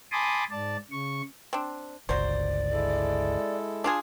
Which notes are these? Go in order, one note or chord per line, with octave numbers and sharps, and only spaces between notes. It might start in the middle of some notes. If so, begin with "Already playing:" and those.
G#5 A5 B5 C6 D6 D#6
G#2 D5 A5
C#3 C#6
C4 D4
G1 C#2 F#3 C5 D5
G#3 E4 A4
D4 F4 G#4 A5